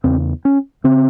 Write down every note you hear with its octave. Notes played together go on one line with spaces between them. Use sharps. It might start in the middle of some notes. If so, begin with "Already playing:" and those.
E2 C#3 C4
C#4
C#3 C4